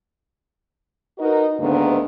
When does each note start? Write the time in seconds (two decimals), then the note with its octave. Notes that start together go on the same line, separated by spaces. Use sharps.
1.18 D#4 F#4 A#4 B4 D#5
1.60 D2 G#2 D3 D#3 A#3 B3